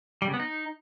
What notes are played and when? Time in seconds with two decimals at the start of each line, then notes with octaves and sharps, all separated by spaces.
0.22 G3
0.28 C#3
0.34 B3
0.40 D#4